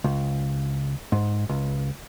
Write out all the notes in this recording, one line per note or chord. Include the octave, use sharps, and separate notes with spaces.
C#2
G#2
C#2